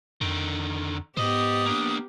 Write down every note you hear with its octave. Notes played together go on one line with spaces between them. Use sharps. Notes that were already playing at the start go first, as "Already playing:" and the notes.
F2 D3 D#3
G#2 B3 G4 C5 D#5 D#6
A#3 D4